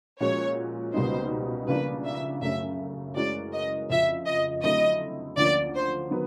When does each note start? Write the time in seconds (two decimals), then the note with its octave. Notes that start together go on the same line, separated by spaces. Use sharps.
0.20 A#2 F3 G#3 C#4 F#4 C#5
0.94 C#2 B2 G3 A#3 D#4 C5
1.68 C#3 F3 A#3 D4 B4
2.05 E5
2.42 F#2 C#3 F#3 A3 C#4 E5
3.16 E3 G#3 C#4 F#4 A#4 D5
3.53 D#5
3.90 F2 C#3 F3 E5
4.27 D#5
4.63 D3 F#3 A3 C4 E4 D#5
5.37 D2 D3 F3 A#3 C#4 D5
5.74 C5
6.11 D#3 F#3 B3